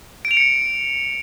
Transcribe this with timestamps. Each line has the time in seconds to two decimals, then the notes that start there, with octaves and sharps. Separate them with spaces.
0.25 D7
0.31 F7
0.37 C#7